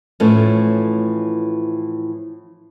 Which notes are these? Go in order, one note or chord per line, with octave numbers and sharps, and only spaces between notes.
A2 E3 F3 A3 C#4